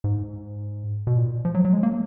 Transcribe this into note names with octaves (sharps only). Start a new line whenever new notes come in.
G#2
B2
A#2
F3
F#3
F#3
G#3
A#3